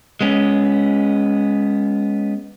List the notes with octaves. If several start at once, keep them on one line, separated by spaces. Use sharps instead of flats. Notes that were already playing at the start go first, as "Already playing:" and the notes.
G#3 B3 C#4